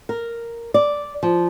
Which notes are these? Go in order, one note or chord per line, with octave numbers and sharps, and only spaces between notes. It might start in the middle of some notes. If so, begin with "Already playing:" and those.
A#4
D5
F3